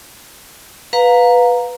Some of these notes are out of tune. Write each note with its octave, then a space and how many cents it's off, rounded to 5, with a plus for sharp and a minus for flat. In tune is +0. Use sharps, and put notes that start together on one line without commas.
B4 +0 F5 +25 A#5 +0